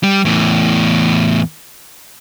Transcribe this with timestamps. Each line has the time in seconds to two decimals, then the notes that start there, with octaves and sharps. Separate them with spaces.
0.03 G3
0.25 E2 A2